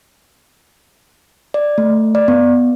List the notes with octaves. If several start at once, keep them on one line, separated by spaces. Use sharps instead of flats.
D5
A3
D5
B3